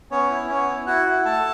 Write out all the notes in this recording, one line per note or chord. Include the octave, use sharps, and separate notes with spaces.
B3 C#4 C#5
E4
B3 C#4 C#5
E4
E4 F#4 F#5
E4
A3 A4 A5